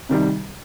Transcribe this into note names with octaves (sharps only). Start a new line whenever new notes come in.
C3 D#3 G3